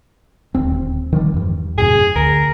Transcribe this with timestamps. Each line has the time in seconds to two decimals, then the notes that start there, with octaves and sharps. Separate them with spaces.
0.55 D1 D#2 C4
1.13 D#3 F3 G3
1.34 E2 G2
1.78 F#2 A2 C3 G#4
2.16 D2 A#4